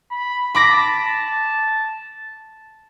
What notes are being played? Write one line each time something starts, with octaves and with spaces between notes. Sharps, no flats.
B5
A5 B5 D6 A#6